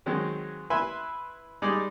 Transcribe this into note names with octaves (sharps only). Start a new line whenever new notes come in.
D#3 F#3 G#3 C4
E4 B4 E5 G#5 C6
G3 G#3 D#4 G#4 D5